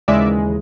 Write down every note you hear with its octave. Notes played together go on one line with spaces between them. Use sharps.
D#2 C#3 E3 G#3 D5 E5